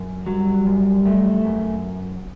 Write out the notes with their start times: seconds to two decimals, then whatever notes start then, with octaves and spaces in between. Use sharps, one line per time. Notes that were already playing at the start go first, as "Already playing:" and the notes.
Already playing: F#2
0.26 F#3 G3
0.66 F#2
1.06 A3
1.45 F#2